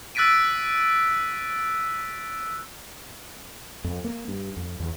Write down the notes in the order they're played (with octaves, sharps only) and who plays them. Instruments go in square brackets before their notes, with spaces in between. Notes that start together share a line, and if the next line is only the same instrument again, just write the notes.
[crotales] E6 F#6 A6 B6 D7 D#7
[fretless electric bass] F2
A#3
G2
F2
E2